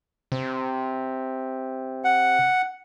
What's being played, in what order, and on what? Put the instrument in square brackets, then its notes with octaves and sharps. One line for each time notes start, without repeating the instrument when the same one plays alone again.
[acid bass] C3
[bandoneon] F#5